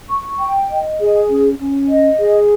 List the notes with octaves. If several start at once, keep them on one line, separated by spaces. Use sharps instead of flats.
C#6
G5
D#5
G#4
C#4
C#4
D#5
G#4